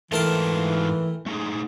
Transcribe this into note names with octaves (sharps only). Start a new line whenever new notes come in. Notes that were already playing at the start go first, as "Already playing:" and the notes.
G#2 E3 A3 F4 A#4 G5 A5
A3 D#4 G#4